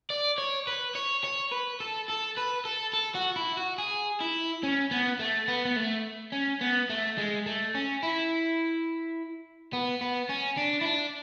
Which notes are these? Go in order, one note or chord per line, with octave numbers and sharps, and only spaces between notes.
D5
C#5
B4
C#5
C#5
B4
A4
A4
B4
A4
A4
F#4
E4
F#4
G#4
E4
C#4
B3
A3
B3
B3
A3
C#4
B3
A3
G#3
A3
C#4
E4
B3
B3
C#4
D4
E4
D4